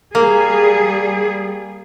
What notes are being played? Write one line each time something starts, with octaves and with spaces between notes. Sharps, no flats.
G3 A#3 G#4